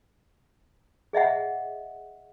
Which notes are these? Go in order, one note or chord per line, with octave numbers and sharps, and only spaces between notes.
G#4 D#5 E5 F#5